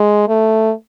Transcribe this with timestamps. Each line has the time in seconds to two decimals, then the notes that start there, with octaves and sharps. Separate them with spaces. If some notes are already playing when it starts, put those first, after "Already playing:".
Already playing: G#3
0.28 A3